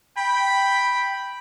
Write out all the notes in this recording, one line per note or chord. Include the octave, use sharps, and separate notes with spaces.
G5 B5